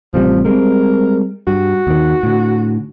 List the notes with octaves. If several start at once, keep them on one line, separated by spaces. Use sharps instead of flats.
A1 C3 F3 G3
G3 G#3 C4 A#4
G2 F#4
D#2 D#3
A2 D3